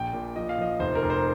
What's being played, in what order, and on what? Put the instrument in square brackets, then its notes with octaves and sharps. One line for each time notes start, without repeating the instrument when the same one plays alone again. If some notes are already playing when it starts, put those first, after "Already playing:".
Already playing: [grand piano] A#1 G5
A#2
F3 D#5
F5
F3 D#5
F1 C5
A#4
F1
C5